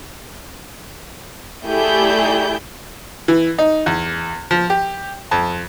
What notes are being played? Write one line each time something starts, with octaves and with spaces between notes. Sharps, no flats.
A3 E4 G4 G#4 D5 G6
E3
D#4
E2
F3
G4
F2